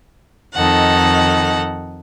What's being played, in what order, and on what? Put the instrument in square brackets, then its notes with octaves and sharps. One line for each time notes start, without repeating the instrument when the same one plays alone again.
[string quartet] F2 D#3 D#4 A4 F#5